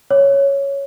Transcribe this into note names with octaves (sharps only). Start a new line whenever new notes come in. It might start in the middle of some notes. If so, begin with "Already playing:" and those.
C#5